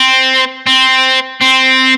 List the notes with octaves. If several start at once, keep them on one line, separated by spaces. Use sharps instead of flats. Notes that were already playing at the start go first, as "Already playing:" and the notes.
Already playing: C4
C4
C4